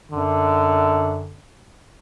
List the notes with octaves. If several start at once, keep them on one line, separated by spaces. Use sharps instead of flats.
F#2 D3